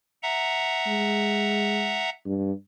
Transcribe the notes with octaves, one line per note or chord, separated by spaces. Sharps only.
E5 F#5 A#5
G#3
G2